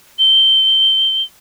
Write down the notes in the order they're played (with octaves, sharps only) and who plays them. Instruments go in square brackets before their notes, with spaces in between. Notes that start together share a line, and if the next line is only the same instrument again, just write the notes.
[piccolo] G7